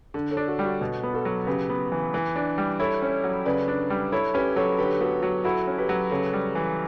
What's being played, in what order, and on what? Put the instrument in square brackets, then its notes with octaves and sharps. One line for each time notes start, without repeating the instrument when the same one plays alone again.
[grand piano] D3
[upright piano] A4 C#5
[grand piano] D4
[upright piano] F#4 A4
[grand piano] G3
[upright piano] F#4
[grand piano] B2
B3
[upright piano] F#4 A4
[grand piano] F#3
[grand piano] C#3 [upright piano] G4 B4
[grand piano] B3
E3
E3
D4
G3
[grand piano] E4 [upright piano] A4 C#5
[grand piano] C#4
F#3
[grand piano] C#3 [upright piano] B4 D5
[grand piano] D4
G3
[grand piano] E4 [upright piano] A4 C#5
[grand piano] C#4 [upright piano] G4 B4
[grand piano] F#3 [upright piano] A4 C#5
[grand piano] D3 [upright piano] G4 B4
[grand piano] B3 [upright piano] F#4 A4
[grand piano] F#3 [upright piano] F#4
[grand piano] E4 [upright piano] F#4 A4
[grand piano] C#4
[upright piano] G4 B4
[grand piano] F#3
[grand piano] C#3 [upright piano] A4 C#5
[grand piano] G3
E3